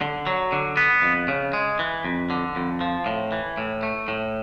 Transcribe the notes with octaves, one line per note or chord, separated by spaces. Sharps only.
D3
F#3
D3
B3
F2
C#3
G#3
E3
F2
D3
F2
F3
A2
E3
A2
A3
A2